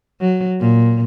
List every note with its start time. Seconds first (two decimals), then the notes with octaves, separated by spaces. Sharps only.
0.21 F#3
0.60 A#2